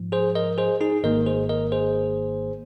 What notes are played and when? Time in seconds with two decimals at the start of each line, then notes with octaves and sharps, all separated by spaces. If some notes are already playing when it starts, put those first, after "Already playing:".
Already playing: G#2 F3
0.12 G#4 C5
0.35 A#4 D#5
0.58 G#4 C5
0.81 D#4 G#4
1.03 G#1 G#2 D#3 A#3 A#4 D#5
1.26 G#4 C5
1.49 A#4 D#5
1.72 G#4 C5